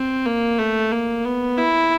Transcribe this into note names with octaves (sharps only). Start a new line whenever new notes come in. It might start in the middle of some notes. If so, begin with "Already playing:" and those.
Already playing: C4
A#3
A3
A#3
B3
E4